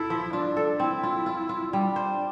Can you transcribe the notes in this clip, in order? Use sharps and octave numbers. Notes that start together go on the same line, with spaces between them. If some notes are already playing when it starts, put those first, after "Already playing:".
Already playing: E4 A4
F3
D4 F4
A4
C4 E4
F4
F4
F4
G3 D4
C5